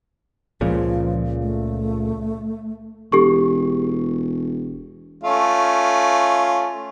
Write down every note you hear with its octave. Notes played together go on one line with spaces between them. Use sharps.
C#2 A#2 C#3 F3
A3
E1 G4 A4 C#6
A3 C#4 F4